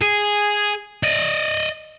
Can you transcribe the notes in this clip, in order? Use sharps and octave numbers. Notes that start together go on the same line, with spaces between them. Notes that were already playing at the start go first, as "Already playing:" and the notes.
G#4
D5 D#5